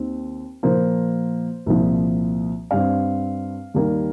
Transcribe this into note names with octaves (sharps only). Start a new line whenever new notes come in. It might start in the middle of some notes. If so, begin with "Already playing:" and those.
Already playing: D#2 D#3 C4
A#2 F3 A#3 C5
C2 A#2 F3
G2 G3 C4 F5
D#2 D#3 G3 A#3